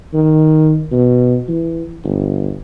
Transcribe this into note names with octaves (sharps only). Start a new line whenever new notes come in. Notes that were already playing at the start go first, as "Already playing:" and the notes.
D#3
B2
E3
G1